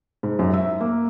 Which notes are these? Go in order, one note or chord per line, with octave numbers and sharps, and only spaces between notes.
G#2
F#2
E5
A#3